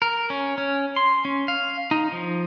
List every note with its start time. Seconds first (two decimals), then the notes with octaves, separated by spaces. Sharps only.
0.02 A#4
0.30 C#4
0.58 C#4
0.96 C6
1.25 C#4
1.48 F5
1.91 D#4
2.12 F3